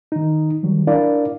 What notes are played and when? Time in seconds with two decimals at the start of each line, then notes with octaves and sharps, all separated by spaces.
0.12 D#3 D#4
0.63 D#3 F#3 G3
0.87 D4 E4 A#4 D5 F5